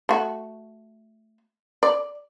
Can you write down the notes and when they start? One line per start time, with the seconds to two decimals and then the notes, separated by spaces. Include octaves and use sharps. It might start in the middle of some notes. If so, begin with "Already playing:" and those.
0.09 A3 F#4
1.83 D5